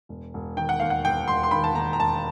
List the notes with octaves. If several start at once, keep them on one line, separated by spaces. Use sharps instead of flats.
E1
E1
D#3 G5
F#5
D#2 F5
F#5
E1 G5
E1 C6
C6
D#3 B5
A5
D#2 A#5
A#5
E1 A5